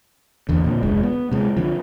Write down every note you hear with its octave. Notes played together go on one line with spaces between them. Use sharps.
E2 D3
A#2 D3
F1 D2 G#3
B3
C3 G#3
D3 F3